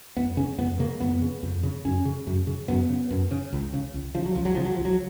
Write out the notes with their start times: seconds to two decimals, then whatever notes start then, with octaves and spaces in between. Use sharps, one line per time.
0.17 F2 B3
0.37 C#3 C#4
0.58 F2 B3
0.79 C#3 A#3
1.00 F2 B3
1.22 C#3
1.43 F2
1.63 C#3
1.85 F#2 C#4
2.05 C#3
2.27 F#2
2.47 C#3
2.68 F#2 B3
2.89 C#3
3.10 F#2
3.31 C#3
3.53 C#2
3.73 C#3
3.94 C#2
4.15 C#3 F3
4.25 F#3
4.35 C#2 F3
4.45 F#3
4.55 C#3 F3
4.65 F#3
4.75 C#2 F3
4.85 F#3